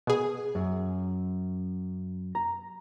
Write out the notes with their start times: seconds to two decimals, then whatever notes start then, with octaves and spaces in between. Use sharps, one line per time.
0.07 B2 G#4
0.55 F#2
2.35 A#5